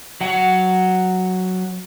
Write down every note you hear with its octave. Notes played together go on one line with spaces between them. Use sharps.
F#3 F#5